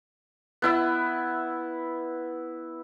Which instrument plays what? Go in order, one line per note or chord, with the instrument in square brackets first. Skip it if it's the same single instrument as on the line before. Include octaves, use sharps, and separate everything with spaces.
[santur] B3 E4 E5